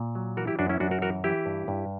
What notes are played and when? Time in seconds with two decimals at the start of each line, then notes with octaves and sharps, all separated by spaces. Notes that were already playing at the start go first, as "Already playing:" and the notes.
Already playing: A#2
0.15 F#3
0.37 E3 F#4 A#4
0.47 E4 G4
0.59 F#2 D4 F#4
0.69 C#4 E4
0.80 F#2 D4 F#4
0.91 F#4 A#4
1.02 E3 F#4 A#4
1.24 E3 E4 G4
1.46 G2
1.68 G2